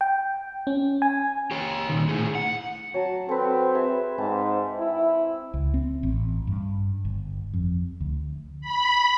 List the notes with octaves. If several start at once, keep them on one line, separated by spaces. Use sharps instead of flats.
G5
C#4
G#5
G4 C#5
A#2 D#3
A2 G#4
F#5
F#3 A5 A#5
C4 A4 B4
G#4 B4 E5
G#2 C4 A5
E4
C#2
C4
A1
G2
G1
F2
D2
B5